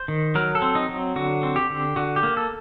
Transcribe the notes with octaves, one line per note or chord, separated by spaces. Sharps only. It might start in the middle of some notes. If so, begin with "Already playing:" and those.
Already playing: C5
D#3
F#3 A#4
A4
C4
D#4
F#3
D3 F#4
C4
G4
D3
D3 F#4
G4
A#3
A4